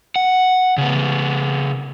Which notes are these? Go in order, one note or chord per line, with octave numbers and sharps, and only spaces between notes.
F#5
C#3 B3